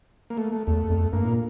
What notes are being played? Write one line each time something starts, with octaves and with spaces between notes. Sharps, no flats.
A#3
A3
A3
E2 A3
F2
G2 A#3
A2
A#2